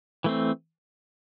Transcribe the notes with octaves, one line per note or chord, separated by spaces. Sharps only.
E3 A3 C4